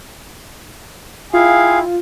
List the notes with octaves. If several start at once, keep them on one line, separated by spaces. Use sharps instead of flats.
E4 F4 G#4 F5 G5 G#5